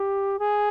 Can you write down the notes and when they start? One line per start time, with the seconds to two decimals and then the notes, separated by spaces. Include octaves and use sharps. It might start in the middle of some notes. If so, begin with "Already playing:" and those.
Already playing: G4
0.39 G#4